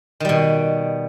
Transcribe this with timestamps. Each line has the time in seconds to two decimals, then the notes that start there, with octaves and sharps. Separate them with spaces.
0.20 D#3
0.25 G3
0.29 B2